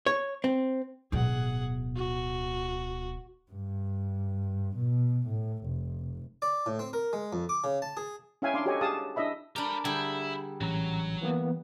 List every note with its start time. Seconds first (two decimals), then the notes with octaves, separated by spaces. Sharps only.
0.06 C#5
0.44 C4
1.12 D1 B2 G#4 F#5
1.96 F#4
3.51 G2
4.77 B2
5.27 A2
5.66 F1
6.42 D5
6.66 A2
6.79 C4
6.93 A#4
7.13 G#3
7.33 F2
7.49 D6
7.64 C#3
7.82 A5
7.97 G#4
8.42 C#4 E4 E5 F5 G5 G#5
8.54 D4 F5 C6 D6
8.66 F#4 G4 A4 C#5 D#5 G#5
8.81 G4 G#4 F5 A5 D#6
9.16 D4 E4 D#5 E5 B5
9.56 D4 G4 A#4 B5
9.85 D3 G3 E4 G#4
10.61 A1 F#3 A#5
11.22 E3 A#3 B3